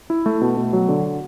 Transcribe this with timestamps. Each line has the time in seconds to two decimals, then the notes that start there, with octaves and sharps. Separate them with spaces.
0.10 E4
0.26 A3
0.41 B2
0.57 B2
0.73 F#3
0.88 D3